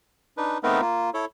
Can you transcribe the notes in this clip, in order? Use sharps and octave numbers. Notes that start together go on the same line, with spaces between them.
D4 D#4 B4
A3 B3 C4 D#4 A#4 B4
A#3 F4
E4 A4 C#5